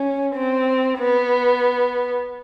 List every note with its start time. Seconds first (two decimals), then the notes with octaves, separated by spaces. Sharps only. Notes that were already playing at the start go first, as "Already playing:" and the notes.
Already playing: C#4
0.35 C4
0.98 B3